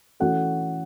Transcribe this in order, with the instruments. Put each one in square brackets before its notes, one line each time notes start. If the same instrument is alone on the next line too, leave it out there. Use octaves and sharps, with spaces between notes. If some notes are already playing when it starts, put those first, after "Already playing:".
[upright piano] E3 A3 C#4 F#4 A4 [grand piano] F#5